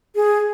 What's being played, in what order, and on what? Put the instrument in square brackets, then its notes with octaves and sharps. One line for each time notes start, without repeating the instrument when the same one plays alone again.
[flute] G#4